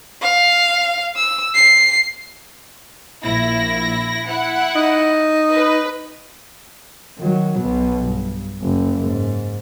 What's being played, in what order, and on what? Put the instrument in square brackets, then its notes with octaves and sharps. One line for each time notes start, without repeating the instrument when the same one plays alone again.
[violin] F5
E6
C7
[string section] A#1 E4 A#6
E4 F#5
[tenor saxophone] D#4
[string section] B4
[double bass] D#3 F#3
B1 B2
G2
F#1
G#2